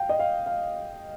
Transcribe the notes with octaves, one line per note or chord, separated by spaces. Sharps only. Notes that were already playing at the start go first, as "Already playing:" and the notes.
Already playing: F5 G5
D#5
F5
F5